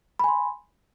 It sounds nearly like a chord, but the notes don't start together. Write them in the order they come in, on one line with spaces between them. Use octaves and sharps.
B5 G#5 C6